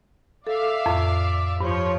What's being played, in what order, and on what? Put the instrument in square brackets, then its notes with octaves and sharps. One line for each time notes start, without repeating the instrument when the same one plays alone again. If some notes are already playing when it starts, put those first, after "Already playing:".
[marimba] A4 [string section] D5 E5 F5
[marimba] F2 A2
[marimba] G2 [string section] F3 C#5